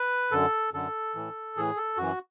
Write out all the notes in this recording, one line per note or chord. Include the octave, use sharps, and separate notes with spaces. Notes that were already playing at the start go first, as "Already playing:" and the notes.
Already playing: B4
F#2 D3 A4
F#2 D3 A4
A2 E3
A2 E3 G#4
A4
F#2 E3 F#4